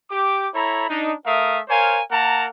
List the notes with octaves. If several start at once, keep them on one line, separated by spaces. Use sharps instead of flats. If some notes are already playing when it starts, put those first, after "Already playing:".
G4 D6
E4 A4 C#5 A#5 B5
D4 D#4
A3 A#4 E5 F5 D#6
A#4 C5 C#5 F5 G#5
A#3 A#4 F#5 A5 A#5